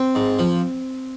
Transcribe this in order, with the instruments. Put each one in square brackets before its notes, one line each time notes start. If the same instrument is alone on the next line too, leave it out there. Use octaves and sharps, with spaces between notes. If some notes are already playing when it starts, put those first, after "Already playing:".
Already playing: [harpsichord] C4
G#2
F3